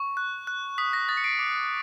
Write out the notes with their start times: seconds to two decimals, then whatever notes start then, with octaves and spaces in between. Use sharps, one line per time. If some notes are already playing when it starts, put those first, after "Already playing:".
Already playing: C#6
0.17 F#6
0.47 F#6
0.78 D#6 B6
0.93 A#6
1.09 D#6 A6
1.17 C#7
1.24 C7 D7
1.39 D6